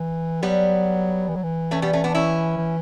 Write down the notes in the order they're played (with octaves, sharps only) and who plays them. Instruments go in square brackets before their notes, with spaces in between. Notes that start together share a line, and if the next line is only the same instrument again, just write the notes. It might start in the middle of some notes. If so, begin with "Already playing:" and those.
Already playing: [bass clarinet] E3
[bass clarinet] F#3 [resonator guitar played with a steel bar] G3 B3
[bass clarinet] E3
F#3
E3
[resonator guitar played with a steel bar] A3 C#4
G3 B3
A3 C#4
B3 D4
C#4 E4
[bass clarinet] E3